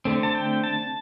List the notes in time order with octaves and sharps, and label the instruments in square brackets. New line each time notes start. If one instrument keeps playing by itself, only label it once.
[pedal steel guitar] D3 A3 C4
A5
G5
A5